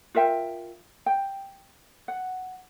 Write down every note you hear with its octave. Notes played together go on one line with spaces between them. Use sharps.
F4 A#4 E5 G5
G5
F#5